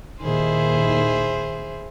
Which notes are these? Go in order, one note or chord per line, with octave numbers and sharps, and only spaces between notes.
D#2 A#2 D#3 E4 G#4 C5